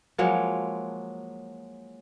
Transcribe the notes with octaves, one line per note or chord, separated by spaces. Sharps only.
F3 F#3 G#3 A#3